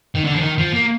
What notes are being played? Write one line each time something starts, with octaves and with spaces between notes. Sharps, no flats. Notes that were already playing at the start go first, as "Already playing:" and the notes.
D#3
D3
F3
D#3
F3
A#3